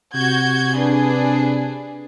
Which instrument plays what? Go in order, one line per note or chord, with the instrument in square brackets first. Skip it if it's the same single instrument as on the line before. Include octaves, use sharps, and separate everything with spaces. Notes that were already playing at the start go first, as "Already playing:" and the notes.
[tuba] C3 [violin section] F#4 G6 G#6
[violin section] D4 G#4 B4